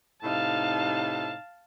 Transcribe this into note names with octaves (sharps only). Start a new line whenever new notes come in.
A2 C3 D#4 F5 A5